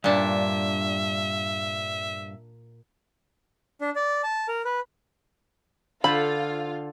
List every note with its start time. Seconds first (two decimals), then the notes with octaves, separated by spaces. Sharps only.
0.04 G2 A#2 D4 E5
3.81 D4
3.96 D5
4.24 A5
4.48 A#4
4.65 B4
6.04 D3 F4 A4 C5 F5 B5